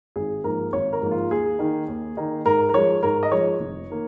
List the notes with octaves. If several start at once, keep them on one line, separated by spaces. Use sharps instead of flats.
G#1 G#4
G#2 F3 A#3 A#4
G#1 C#5
A#4
G#2 F3 A#3
F4
D#2 G#4
D#3 A#3 D#4
D#2
D#3 A#3 D#4
G#2 A#4
A#4
F3 G#3 C#5
G#2 A#4
D#5
F3 G#3 C#5
F1
D#3 A#3